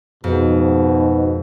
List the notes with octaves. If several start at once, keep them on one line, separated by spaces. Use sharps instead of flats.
F2 G#2 B2